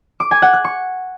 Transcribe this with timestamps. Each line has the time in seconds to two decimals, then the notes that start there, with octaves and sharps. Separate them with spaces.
0.20 D6
0.31 G#5
0.42 F#5
0.53 F#6
0.64 C#6